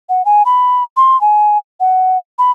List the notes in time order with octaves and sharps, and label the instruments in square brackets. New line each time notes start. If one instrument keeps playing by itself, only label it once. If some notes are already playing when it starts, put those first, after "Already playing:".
[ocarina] F#5
G#5
B5
C6
G#5
F#5
B5